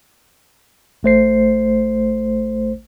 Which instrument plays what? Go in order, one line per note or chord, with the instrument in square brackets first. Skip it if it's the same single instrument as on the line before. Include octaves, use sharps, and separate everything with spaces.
[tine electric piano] A1 A3 C5 C7